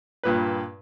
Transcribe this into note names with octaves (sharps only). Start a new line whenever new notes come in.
G2 A#2 B4